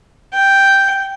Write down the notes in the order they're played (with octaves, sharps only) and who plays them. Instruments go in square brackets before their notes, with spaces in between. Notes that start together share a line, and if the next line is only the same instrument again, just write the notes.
[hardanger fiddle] G5